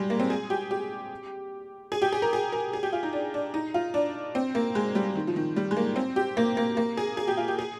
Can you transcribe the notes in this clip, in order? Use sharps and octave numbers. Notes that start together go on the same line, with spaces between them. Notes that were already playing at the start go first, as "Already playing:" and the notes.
Already playing: G3 G#3
A#3
C4
G#4
G4
G4
G#4
G4
G#4
A#4
G#4
A#4
G#4
G4
F4
D#4
D4
D4
D#4
F4
D4
C4
A#3
G#3
G3
D#3
F3
D#3
G3
G#3
A#3
C4
G4
A#3
A#3
A#3
G#4
G#4
G4
F4
G4
G#4